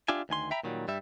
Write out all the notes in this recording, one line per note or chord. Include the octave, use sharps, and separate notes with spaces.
D4 F4 G4 E5 G#5
D2 D#3 G#5 C6
E5 G5 A#5 B5
A#2 D#3 F#3 G3
G2 G3 E5